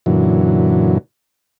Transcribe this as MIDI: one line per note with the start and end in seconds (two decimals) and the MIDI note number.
0.06 0.98 42
0.06 0.98 46
0.06 0.98 50
0.06 0.98 52
0.06 0.98 54